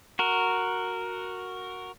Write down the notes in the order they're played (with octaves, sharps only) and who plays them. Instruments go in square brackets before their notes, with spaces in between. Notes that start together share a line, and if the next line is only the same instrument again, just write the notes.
[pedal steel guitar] F#4 A#4